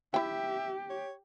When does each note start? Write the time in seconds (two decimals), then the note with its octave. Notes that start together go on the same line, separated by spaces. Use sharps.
0.14 E4 G4 E5 G5
0.90 C#5